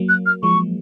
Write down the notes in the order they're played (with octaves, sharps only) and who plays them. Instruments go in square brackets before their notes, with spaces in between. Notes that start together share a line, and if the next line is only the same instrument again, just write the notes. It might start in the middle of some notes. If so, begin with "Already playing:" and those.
Already playing: [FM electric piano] F#3 A#3
[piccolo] F#6
F6
[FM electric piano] F3 G#3 [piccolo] C#6